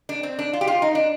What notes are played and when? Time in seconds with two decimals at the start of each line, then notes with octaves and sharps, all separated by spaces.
0.09 D4
0.23 C4
0.39 D4
0.53 F4
0.61 G4
0.67 F4
0.82 D#4
0.95 D4